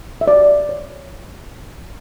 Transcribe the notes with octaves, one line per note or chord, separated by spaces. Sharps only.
E5
F#4 D5
C#5